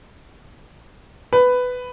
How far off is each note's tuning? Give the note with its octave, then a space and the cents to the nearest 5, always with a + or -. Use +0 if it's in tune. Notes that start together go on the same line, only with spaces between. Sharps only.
B4 +10